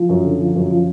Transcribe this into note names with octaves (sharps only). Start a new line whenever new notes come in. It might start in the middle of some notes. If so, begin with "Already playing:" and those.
Already playing: F3
F#2
D3
F3
F#2
F3